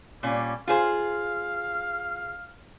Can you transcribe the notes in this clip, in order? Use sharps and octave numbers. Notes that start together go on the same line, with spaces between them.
A#2 G3 C#4
F4 G#4 C5 F5